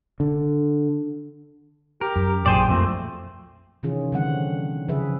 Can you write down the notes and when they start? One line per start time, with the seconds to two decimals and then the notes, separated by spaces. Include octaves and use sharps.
0.20 D3
2.01 G4 A#4
2.16 F#2
2.46 A#1 F#2 A#2 G#4 C5 D5 G5
2.69 F2 F3 A3 A#3 C4
3.83 C3 D#3 E3 C#4 F4 G#4
4.12 D3 E3 G3 C4 F#5
4.88 C#3 F3 G#4 B4 E5